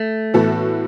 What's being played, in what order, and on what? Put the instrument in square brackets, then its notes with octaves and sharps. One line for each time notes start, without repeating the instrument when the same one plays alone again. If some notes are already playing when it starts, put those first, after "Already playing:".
Already playing: [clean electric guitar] A3
[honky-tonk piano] A2 E3 B3 F#4 A4